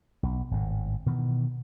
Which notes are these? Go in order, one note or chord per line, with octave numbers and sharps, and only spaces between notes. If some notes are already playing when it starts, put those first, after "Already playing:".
B1
G#1 A2
B2 D#3 E3